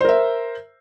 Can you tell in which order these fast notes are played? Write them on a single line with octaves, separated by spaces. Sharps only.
C5 A#4 E5